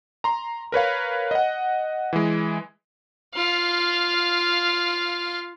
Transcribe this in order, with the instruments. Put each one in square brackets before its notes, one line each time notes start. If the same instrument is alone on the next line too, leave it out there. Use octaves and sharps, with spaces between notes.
[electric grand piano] A#5 C6
A#4 B4 C#5 F5
D#5 F#5
E3 G#3
[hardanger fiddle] F4 F5